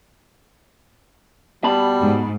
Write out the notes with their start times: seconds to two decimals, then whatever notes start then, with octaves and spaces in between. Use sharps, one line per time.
1.64 B2 G3 A5 B5
2.02 G#2